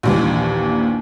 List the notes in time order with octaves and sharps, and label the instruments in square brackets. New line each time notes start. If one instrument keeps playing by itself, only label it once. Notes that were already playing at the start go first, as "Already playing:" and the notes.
[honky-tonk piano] A#1 D#2 E3